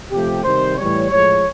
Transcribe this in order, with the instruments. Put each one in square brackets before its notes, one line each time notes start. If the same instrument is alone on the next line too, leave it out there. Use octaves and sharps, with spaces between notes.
[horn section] C3 F3 A3 G4
C3 D#3 G3 C5
A2 E3 G3 C#5
A2 F3 G#3 C#5